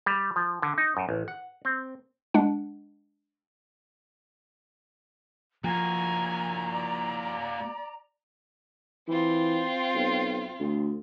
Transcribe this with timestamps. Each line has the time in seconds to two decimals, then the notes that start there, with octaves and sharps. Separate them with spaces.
0.06 G3
0.36 F3
0.62 D3
0.78 D#4
0.97 F#2
1.09 A1
1.28 F#5
1.65 C4
2.34 G#3 D4 F#5
5.64 F3 A#3 F#4 G#5 A#5
6.72 D5
9.08 E3 C4 F4
9.95 B1
10.60 D2